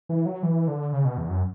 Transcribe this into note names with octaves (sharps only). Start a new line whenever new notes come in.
E3
F#3
E3
D3
C#3
B2
E2
F#2